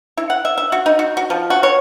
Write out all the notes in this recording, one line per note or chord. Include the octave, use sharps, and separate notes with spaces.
E4
F#5
E5
E5
F#4
D#4
F#4
F#4
F3
F#4
C#5